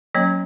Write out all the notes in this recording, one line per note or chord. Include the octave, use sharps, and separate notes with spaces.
F#3 A#3 C#4 C#5